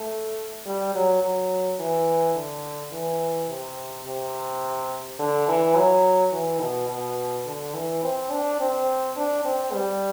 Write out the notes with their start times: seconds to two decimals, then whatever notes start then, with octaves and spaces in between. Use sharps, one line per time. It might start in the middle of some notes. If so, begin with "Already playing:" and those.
Already playing: A3
0.66 G3
0.95 F#3
1.23 F#3
1.80 E3
2.36 D3
2.92 E3
3.50 C3
4.06 C3
5.19 D3
5.49 E3
5.76 F#3
6.33 E3
6.61 B2
6.89 B2
7.46 D3
7.74 E3
8.03 C4
8.31 D4
8.60 C4
9.17 D4
9.45 C4
9.74 G3